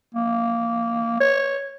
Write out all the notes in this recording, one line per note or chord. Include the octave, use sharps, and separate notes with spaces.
A#3
C#5